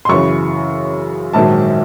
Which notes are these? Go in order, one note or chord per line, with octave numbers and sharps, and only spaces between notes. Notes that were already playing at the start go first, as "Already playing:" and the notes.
C6
F#2 C#3 E3 C#6
A#1 G#2 D#3 F#3 A5